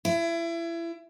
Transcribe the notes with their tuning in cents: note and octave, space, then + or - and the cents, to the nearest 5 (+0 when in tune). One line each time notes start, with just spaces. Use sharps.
E4 +30